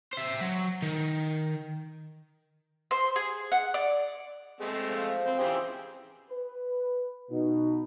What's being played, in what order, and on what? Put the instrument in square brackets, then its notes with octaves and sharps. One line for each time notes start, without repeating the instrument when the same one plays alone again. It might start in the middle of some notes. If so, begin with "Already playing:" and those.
[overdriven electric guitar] C5 E5
F#3
D#3
[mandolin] C5
G#4
F#5
D5
[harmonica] G#3 A3 C4
[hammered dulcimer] F3
[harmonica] C4 [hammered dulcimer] B4
[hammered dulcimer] C#3 E3 [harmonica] G4 G#4 C5
[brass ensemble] B4
B2 D#4